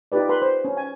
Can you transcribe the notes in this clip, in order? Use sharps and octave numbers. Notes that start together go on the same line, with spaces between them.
D#4 F4 G4 B4 D5
B4 B5 C6
C5
C#4
G#5